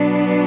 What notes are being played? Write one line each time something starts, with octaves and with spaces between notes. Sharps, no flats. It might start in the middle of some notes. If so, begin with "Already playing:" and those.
Already playing: B2 F#3 B3 D4